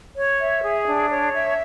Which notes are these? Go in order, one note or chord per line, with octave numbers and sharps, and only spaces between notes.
C#5
E5
G#4
D4
C#5
E5